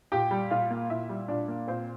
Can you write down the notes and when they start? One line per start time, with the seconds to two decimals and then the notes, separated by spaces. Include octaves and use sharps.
0.12 A#2 G4 G5
0.31 G3
0.51 A#2 F4 F5
0.70 A#3
0.90 A#2 E4 E5
1.09 G3
1.28 A#2 D4 D5
1.48 A#3
1.68 A#2 C4 C5